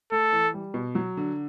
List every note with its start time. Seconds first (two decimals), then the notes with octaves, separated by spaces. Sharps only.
0.12 A3 A4
0.32 E3
0.54 G3
0.74 B2
0.95 F#3
1.17 D3